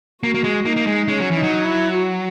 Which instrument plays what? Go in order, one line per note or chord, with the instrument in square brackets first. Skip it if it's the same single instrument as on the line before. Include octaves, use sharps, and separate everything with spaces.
[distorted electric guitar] A#3 [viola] F#4
[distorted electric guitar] A#3
G#3
[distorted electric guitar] A#3 [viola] D#4
[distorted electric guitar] A#3
G#3
[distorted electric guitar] G#3 [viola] C#4
[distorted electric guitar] F#3
E3
[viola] D#4
[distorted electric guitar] F#3
[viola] E4
F#4